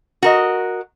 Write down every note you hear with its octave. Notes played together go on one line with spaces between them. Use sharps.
F#4 A#4 D#5